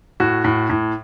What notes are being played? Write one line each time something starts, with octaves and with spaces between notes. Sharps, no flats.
A2 F#4
A2
A2